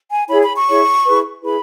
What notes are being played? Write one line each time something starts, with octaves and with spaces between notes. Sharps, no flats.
G#5
E4 G#4 C#5 B5
B5
C#6
E4 G#4 C#5
E4 G#4 B4
E4 G#4 B4 B5